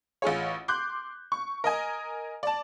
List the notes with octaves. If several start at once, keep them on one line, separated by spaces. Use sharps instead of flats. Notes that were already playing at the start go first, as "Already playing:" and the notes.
A1 F4 G#4 C#5
C6 D6 F#6 G6
C#6
A#4 D#5 G#5
D5 A5